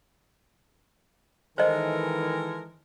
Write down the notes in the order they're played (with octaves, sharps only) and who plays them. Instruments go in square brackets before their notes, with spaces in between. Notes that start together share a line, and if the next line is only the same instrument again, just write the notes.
[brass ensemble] D#3 E3 [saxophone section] G#3 A4 A#4 [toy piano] C5 D#5